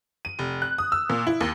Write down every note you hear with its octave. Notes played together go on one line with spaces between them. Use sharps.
D#7
F1
F#6
D#6
E6
A#2
E4
D#2